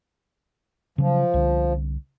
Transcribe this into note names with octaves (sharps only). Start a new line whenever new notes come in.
C#3 F3 F#3
C2 D3